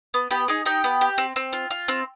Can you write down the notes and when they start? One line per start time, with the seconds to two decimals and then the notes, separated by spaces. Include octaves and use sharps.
0.14 B3
0.31 B3 G4 G5
0.48 D#4 G#4 G#5
0.65 D#4 G4 G5
0.84 B3
1.01 G4
1.18 C4
1.36 C4
1.53 F4
1.70 F4
1.88 C4